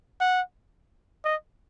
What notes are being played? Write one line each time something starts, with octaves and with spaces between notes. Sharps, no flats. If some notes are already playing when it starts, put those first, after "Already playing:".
F#5
D#5